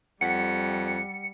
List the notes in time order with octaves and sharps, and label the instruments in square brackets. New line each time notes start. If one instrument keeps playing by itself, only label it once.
[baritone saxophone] F2 [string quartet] G3 [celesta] F#5 B6 [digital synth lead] C#7